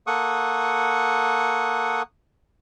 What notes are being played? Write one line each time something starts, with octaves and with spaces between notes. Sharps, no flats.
A#3 A4 F#5 C#6 D#6